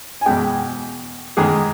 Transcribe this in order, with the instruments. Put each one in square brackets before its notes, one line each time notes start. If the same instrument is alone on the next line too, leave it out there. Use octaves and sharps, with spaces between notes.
[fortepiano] G#5
E2 B2 G#3 G5
E2 D#3 G#3 G#4